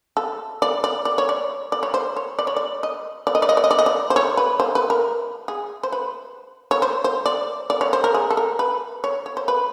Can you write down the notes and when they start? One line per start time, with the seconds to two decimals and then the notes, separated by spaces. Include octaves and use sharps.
0.17 A4
0.62 D5
0.84 D5
1.05 D5
1.18 C#5
1.29 D5
1.72 D5
1.83 C#5
1.94 C5
2.16 C#5
2.39 D5
2.47 C#5
2.56 D5
2.83 D#5
3.27 D5
3.35 D#5
3.42 D5
3.49 D#5
3.57 D5
3.64 D#5
3.71 D5
3.79 D#5
3.86 D5
4.10 C5
4.16 C#5
4.37 B4
4.60 C5
4.75 B4
4.90 A#4
5.48 G#4
5.83 C5
5.92 B4
6.71 C#5
6.82 C5
7.04 C5
7.26 D5
7.70 D5
7.81 C#5
7.93 C5
8.04 A#4
8.14 G#4
8.30 A4
8.37 A#4
8.59 B4
9.04 C#5
9.26 C#5
9.37 C5
9.48 B4